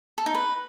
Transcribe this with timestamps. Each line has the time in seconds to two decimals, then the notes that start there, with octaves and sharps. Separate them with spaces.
0.18 A4
0.26 D#4
0.34 B4